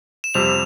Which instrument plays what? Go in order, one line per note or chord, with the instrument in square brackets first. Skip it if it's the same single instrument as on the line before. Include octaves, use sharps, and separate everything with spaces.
[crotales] E7
[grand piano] F2 C3 G3 C4 [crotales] F7